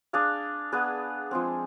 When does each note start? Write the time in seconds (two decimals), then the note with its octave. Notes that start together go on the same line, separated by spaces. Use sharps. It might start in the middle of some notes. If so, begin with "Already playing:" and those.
0.13 D4 G#4 D5 F5
0.72 B3 D4 G#4 B4
1.31 F3 G#3 C4